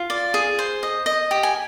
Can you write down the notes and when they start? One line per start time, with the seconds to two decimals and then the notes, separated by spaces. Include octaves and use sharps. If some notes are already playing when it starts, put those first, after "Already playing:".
Already playing: F4
0.10 D5
0.34 G#4
0.59 C5
0.83 D#5
1.06 D#5
1.31 G4
1.43 G#5